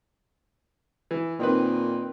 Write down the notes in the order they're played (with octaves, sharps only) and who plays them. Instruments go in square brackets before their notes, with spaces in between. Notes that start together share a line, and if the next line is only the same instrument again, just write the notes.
[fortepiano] E3
[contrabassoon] A#2 [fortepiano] D#3 C4 B4